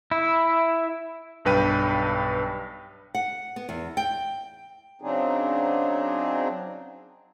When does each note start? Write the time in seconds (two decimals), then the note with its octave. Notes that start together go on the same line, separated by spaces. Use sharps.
0.11 E4
1.45 B1 G2 B4 G5 D#7
3.15 F#5
3.56 B3
3.69 E2
3.97 G5
5.02 C#3 F#3 C4 D4 D#4 G#4